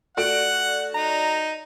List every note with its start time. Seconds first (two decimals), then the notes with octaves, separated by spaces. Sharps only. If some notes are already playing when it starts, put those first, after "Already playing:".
0.17 A3 F#4 D5 F#5 D7
0.94 D#4 A#5